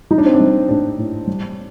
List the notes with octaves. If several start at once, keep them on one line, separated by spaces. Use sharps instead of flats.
G3 D#4
D4
C4
D4
G3
A2 D4
A2
G3